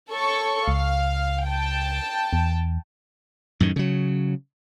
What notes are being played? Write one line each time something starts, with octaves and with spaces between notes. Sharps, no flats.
A4 C#5 C#6
C#2 F5
G5 A5
E2
F#2 A2 D#3
C#3 F#3